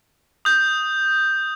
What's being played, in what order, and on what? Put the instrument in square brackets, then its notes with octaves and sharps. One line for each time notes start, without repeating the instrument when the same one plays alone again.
[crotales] D#6 G6